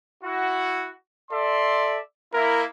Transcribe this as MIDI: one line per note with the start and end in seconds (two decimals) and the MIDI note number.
0.24 0.90 64
0.24 0.90 66
1.31 2.00 69
1.31 1.97 74
1.31 1.97 76
1.31 1.97 84
2.33 2.64 58
2.33 2.64 64
2.33 2.63 70